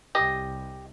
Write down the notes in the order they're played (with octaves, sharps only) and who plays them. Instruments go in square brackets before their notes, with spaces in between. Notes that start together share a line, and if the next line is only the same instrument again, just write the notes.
[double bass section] C2 [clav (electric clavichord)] G4 [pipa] D#5